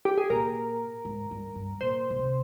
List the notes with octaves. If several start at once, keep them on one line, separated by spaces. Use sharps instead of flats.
G4
G#4
A#2 A#4
G#2
G2
G2
A#2 C5
A#2
C3